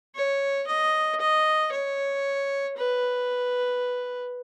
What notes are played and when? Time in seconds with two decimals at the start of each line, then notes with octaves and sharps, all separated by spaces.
0.15 C#5
0.67 D#5
1.20 D#5
1.72 C#5
2.77 B4